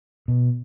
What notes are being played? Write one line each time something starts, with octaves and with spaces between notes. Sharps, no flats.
B2